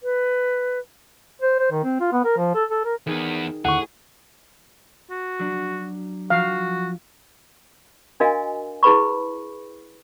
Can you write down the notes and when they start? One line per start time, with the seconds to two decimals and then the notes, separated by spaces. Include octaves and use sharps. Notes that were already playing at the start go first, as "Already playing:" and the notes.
0.02 B4
1.42 C5
1.60 C5
1.71 D#3
1.84 C4
2.00 F4
2.13 B3
2.25 A#4
2.37 F3
2.55 A4
2.70 A4
2.85 A#4
3.07 E2 D#3 B3 G#4
3.65 D#2 A2 D3 G#4 F#5 C#6
5.10 F#4
5.39 F#3 D4
6.30 F3 F#4 F5
8.20 D4 F#4 A#4 D#5 F5 G#5
8.83 E4 G#4 B4 B5 C#6